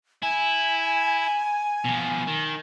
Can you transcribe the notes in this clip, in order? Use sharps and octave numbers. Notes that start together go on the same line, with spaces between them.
E4 G#5
B2 F3
D#3